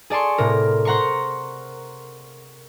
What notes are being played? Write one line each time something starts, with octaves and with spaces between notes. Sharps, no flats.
G#4 D5 A5 C6 C#6
A2 C3 A#4
C5 F#5 A#5 C6 C#6